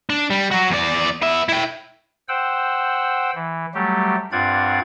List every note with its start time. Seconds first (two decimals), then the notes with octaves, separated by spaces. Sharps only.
0.10 D4
0.30 G3
0.51 F#3 F#4
0.70 E2 D5
1.22 B3 E5
1.49 E4 G5
2.29 C5 F#5 G5 E6
3.35 E3
3.74 F#3 G3 A3 G4
4.32 G2 C4 F4 D5 F#5 G#6